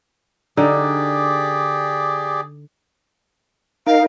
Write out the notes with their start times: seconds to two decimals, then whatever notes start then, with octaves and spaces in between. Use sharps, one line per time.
0.57 D3 D#4 G4 G#4 D5
3.87 D#4 A#4 F5